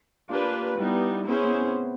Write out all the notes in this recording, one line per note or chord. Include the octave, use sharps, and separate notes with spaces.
A#3 D4 F4 G4 B4
G3 B3 D#4 E4
B3 C#4 E4 G#4 C5
B3
C4